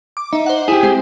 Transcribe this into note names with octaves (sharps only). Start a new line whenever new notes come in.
D6
D#4 E5
C5 F#5
E4 G4 G#4
G#3 C4 C5